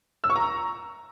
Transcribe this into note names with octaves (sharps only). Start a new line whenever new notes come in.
E6
C#6
A#5